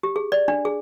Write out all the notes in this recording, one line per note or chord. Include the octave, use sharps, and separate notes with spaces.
G4
G#4
D5
D4
G#4